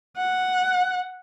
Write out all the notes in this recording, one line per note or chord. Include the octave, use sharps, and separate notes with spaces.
F#5